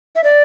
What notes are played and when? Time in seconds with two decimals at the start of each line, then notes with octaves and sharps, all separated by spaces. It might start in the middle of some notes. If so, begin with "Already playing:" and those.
0.16 E5
0.24 D5